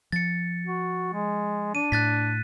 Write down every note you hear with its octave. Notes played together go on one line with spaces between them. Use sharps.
F3 A6 C#7
F#4
G#3
D4 D#7
A2 F#6 A6 B6